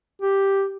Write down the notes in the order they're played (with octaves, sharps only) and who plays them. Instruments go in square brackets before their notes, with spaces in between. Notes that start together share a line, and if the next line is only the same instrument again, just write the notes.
[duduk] G4